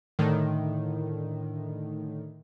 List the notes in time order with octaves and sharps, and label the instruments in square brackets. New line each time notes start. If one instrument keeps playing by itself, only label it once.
[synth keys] A2 D3 D#3